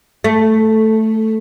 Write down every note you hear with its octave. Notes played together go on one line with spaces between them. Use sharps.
A3